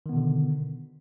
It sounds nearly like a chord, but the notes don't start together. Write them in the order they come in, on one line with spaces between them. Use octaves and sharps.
D#3 B3 B2 D3